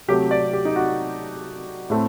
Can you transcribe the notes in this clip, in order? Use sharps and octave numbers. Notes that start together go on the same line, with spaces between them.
C3 F#3 A3 G4
D5
G4
D#4
F#4
A2 A3 C4